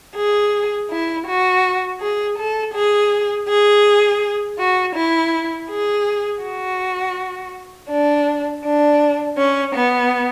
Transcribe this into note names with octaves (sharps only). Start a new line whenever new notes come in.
G#4
E4
F#4
G#4
A4
G#4
G#4
F#4
E4
G#4
F#4
D4
D4
C#4
B3